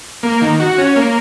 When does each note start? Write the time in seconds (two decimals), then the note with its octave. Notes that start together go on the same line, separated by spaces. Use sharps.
0.23 A#3
0.41 D#3
0.60 F#4
0.78 C#4
0.96 A#3